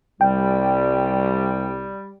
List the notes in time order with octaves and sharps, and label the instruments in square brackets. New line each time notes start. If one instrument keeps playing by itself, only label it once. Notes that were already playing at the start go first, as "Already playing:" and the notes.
[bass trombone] C2 [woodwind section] G3 [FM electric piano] G5